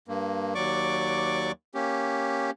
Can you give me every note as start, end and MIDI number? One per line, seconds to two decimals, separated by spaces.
0.08 0.54 43
0.08 0.54 58
0.55 1.52 39
0.55 1.52 54
0.55 1.52 74
0.55 1.52 85
0.55 1.52 86
1.75 2.51 58
1.75 2.51 61
1.75 2.51 67